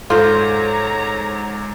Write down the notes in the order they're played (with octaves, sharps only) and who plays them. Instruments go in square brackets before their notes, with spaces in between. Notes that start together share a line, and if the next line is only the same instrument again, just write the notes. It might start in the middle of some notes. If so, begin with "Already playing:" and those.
[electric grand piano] G#2 [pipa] F4 C5 [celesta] A4 [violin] C#5 A#5